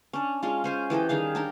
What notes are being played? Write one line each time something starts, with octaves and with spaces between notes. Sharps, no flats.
C#4 D4
G#3 C#4 F4
C#4 C5 G#5
E3 G4 A4 D#5
D#3 G3 G#4 F5
D4 G4 A#4